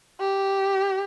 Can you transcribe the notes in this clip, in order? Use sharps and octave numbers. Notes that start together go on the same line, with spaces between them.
G4